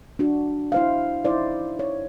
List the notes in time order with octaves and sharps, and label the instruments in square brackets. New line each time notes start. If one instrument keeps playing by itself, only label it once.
[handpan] D4 F#4
E4 C5 F5
D#4 E4 C5 D5
C#5